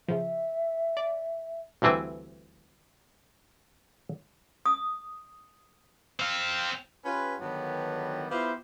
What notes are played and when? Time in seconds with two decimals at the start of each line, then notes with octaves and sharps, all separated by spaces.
0.08 C#3 F3 E5
0.97 D5
1.82 D2 G2 E3 C4 G#5
4.66 D#6
6.20 C4 F5
7.05 C#4 F4 G4 B4
7.41 G2 D3 D#3 F#3 G3 B3
8.30 B3 E4 F4 G4 C5 F5